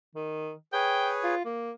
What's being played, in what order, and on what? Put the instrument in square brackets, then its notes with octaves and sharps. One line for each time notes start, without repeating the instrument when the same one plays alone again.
[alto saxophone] D#3
[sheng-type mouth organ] G#4 B4 C#5 [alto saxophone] G5
[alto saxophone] F4
A#3